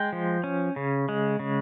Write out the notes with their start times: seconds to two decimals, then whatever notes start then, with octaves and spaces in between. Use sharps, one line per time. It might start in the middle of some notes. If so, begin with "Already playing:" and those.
Already playing: G#3 G5
0.13 F3
0.44 C#4
0.76 C#3
1.09 G#3
1.39 C#3